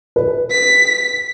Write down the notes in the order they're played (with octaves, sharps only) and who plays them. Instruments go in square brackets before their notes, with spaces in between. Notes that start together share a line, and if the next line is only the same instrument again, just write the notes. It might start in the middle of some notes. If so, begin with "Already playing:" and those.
[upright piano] B4
[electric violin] B6